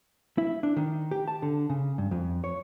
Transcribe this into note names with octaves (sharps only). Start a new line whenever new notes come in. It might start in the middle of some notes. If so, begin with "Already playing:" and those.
E4
D4
D#3
G4
A5
D3
C#3
G2
F2
C#5